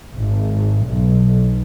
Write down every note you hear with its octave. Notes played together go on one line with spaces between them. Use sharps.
G#1
B1